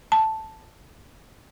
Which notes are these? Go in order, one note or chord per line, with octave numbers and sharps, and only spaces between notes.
A5